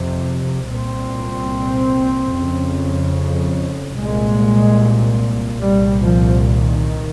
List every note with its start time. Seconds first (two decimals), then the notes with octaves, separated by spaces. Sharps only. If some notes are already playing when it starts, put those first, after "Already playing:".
Already playing: F2 C3
0.70 C2 A#2 C4
2.33 F2 C#3
3.97 C2 A#2 G#3
5.61 C2 A#2 G3
6.02 F3
6.43 D#3